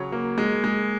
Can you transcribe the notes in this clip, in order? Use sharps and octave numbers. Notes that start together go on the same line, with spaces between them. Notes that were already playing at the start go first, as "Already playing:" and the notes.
Already playing: C#3 F#3 C#5
A#3
G#3
G#3